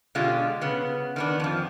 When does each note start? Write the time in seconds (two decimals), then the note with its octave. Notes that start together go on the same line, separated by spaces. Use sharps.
0.15 B2 D3 G#3 F4 G4
0.61 C#3 B3
1.16 D#3 B3 D4
1.40 F2 F3